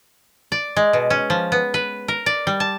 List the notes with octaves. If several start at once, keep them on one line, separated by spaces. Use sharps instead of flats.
D5
G#3
B2
C#4
F3
B3
B4
A#4
D5
G3
A5